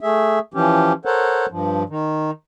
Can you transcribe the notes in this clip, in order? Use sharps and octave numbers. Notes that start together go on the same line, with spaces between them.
A3 G#4 E5
E3 F3 C#4 G4
A4 A#4 C5 C#5 F#5
G2 F3
D#3